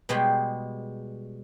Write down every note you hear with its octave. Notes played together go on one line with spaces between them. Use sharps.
B2 G3 G#3 C5 G5